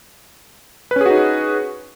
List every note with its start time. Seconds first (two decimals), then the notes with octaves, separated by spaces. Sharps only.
0.91 B4
0.96 C#4
1.01 G#4
1.06 F#4
1.10 D#4